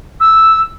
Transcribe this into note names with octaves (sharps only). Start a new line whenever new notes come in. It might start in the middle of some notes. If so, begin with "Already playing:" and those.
E6